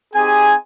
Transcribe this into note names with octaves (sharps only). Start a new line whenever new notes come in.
C4 D#4 G4 G#4 G#5